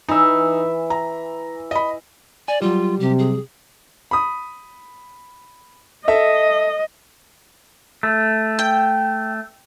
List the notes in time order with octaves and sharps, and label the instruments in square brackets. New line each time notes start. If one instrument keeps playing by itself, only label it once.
[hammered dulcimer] E3 E5 [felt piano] D#4
[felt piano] A#5
D#5 B5
[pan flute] D5 [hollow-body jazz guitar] G#5
[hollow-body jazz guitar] F#3 G3 [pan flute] F4
[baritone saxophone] C3 [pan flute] G4
[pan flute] G#4
[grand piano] B5 D#6
[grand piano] A4 E5 [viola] D#5
[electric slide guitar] A3
[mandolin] G5